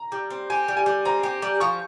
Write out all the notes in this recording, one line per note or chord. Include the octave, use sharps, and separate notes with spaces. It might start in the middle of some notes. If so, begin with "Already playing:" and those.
Already playing: A#5
G3
C4
G4 G#5
G3
G#5
G3
C4 A#5
G4
G3
F3 C#6